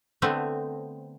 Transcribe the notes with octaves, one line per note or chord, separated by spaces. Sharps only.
D3 A3 B3 C4